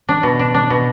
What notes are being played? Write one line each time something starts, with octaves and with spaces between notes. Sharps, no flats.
D4
B2
D4
D4
B2